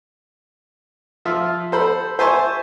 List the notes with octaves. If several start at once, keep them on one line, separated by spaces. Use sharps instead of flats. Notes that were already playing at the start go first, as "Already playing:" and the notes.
F3 F4 E5
A4 C5 B5
C5 E5 G#5 A5 C6 C#6